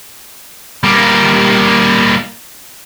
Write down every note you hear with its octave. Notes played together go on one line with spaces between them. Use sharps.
G3 A#3